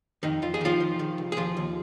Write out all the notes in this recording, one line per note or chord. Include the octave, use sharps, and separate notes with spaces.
F2 D#3 D#4
F2 F4
G#4
D#3 F3 F4
D#3
D#3
C2
G#4
D#2 F3 F4
D#2